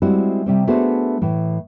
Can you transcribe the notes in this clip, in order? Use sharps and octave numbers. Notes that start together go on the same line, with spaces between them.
G3 G#3 C4 E4 F#4
C3 G3 C4
A3 B3 D4 F#4 G#4 C5
A2 E3